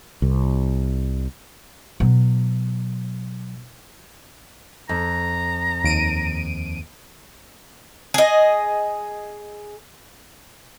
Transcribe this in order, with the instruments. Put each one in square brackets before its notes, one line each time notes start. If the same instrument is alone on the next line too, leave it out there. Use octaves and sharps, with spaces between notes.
[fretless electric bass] C2
[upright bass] B2 F#3
[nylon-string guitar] F2 [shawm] A#5
[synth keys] D#2 D7 D#7
[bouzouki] G#4 D#5